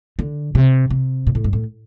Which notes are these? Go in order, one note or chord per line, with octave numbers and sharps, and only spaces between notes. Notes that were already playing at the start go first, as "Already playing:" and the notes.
D3
C3
C3
A#2
A2
G2
A2